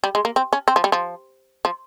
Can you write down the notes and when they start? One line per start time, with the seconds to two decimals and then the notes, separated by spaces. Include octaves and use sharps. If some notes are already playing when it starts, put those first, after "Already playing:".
0.04 G3
0.15 G#3
0.25 A#3
0.36 C4
0.53 C#4
0.68 C4
0.76 F3
0.84 G3
0.92 F3
1.65 F3